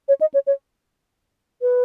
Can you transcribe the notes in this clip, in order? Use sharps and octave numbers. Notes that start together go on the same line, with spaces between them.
C#5
D#5
C#5
C#5
B4